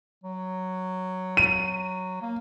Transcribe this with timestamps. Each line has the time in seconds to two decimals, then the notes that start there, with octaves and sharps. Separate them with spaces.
0.24 F#3
1.37 D#7
2.22 A#3